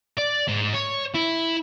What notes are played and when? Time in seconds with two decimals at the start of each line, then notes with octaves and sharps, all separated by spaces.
0.17 D5
0.47 G#2
0.74 C#5
1.15 E4